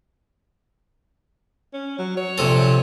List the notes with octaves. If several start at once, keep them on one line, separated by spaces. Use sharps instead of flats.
C#4
F#3
C#5
A#1 C3 A4